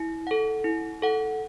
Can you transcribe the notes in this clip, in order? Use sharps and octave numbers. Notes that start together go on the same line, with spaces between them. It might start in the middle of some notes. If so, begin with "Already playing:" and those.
Already playing: E4
A4 F#5
E4
A4 F#5